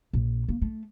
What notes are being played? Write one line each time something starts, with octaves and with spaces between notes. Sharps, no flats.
A#1
A#3
A3